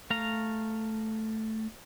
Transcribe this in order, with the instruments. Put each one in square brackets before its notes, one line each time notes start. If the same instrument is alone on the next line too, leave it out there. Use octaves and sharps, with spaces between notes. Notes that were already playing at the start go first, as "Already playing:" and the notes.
[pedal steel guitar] A3 F5 A#5